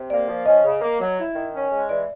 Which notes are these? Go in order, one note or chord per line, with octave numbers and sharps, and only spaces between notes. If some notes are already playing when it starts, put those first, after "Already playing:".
Already playing: C3
A#3 D5
F3
C#4 D#5
C#3
A#3
F#3
E4
D#3
C#4
G#3
E3 D5